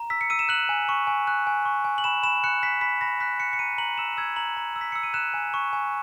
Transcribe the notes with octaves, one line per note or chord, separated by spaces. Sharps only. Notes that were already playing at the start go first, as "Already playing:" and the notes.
Already playing: A#5
E6 B6
C#7
E6 D#7
E7
F#6 F#7
G#5
C#6
G#5
F#6
G#5
C#6
G#5
F#7
B5 E7
B5 E7
F#6 C#7
F#6 B6
B5 B6
B5 A#6
F#6 B6
F#6 C#7
C#7
A#5 D#7
A#5 F#7
E6 E7
E6 G#6
A#5 F#7
A#5
E6
B6
E6 C#7
D#7
F#6 E7
G#5
C#6
G#5